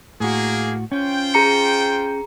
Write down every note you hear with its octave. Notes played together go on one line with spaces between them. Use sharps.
A2 A#3 F#4 G#4
C#4 F4 C5 G5
G#4 A#5 C#7